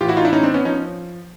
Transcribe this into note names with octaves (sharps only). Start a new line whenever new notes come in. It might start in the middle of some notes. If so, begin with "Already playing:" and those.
A2 E3 F4 G4
E4 F#4
D#4 F4
D4 E4
C#4 D#4
C4 D4
B3 C#4
F3 C#4 D#4